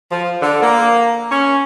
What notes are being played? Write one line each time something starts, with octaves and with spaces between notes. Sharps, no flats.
F3
D3
A#3
C#4